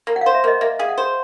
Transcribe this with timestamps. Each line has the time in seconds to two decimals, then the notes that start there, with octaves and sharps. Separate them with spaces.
0.07 A#3
0.16 F#5
0.21 C5 F5
0.34 E5
0.44 A#3 D#5
0.61 A#3 E5
0.79 G#4 F5
0.89 F#5
0.98 C5